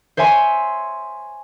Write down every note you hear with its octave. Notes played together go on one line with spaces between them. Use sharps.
C5 C#5 E5 G#5 C6